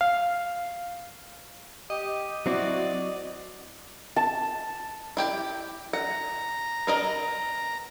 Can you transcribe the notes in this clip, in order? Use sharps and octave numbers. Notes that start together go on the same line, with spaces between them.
F5
G4 D#5
F#3 C4 E4 F#4 D5
A5
E4 G4 G5
F#5 A#5
B3 A#4 D#5